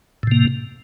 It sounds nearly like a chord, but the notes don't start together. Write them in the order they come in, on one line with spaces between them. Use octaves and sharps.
A2 C3 A#3